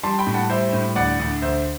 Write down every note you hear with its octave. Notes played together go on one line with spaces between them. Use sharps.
G3 A5 C6
G5 B5
A2
F#5 A5
G3 C5 E5
A2
D2 D5 F#5
D2
D2 C5 E5